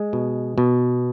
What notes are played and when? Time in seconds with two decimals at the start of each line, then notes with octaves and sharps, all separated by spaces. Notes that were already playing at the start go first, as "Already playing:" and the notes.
Already playing: G#3
0.13 B2
0.58 B2